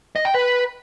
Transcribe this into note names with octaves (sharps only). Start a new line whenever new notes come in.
D#5
G5
B4